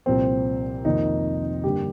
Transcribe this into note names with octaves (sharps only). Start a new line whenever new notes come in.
C2 A#2 F3 C4
F1 F2 D#3 A#3 D#4
G2 D3 G3 A#3 G4